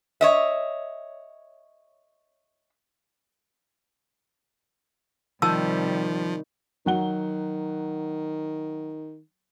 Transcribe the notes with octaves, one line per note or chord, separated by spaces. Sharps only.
C#5 D#5 E5
C3 D#3 F3 G3 A5 E6
D#3 F#3 F#5 G7